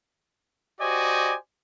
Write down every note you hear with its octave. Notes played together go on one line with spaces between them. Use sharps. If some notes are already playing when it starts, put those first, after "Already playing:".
F#4 G4 C5 D5 D#5 G#5